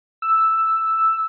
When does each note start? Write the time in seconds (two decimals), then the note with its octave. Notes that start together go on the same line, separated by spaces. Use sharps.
0.22 E6